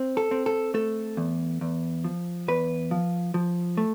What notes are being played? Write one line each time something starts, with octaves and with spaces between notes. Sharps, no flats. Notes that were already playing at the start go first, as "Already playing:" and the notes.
Already playing: C4
A4
C4
A4
A3 A4
E2
E2
F3
E2 B4
F3
F3
A3